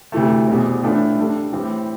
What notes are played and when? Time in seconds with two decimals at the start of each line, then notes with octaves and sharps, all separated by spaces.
0.12 D2 C3 E3 A3
0.48 E2 B2 G3 C4
0.83 A2 E3 A3 D4 F4
1.17 G3 D4 A4
1.52 A2 E3 G3 C4 G4